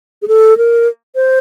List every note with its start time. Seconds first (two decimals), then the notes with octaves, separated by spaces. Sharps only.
0.22 G#4
0.28 A4
0.57 A#4
1.15 C5